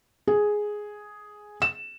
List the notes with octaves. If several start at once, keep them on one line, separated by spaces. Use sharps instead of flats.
G#4
E7